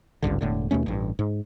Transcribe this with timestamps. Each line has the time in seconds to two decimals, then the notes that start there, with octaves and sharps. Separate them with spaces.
0.22 G#1 C#2 G2 D3
0.41 E1 A2 D3
0.71 D#2 B2 A3 C#4
0.86 A1 G2
1.19 G#2